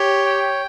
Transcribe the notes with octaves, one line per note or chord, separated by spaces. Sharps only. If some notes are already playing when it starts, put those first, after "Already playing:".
Already playing: G4 C#5
G5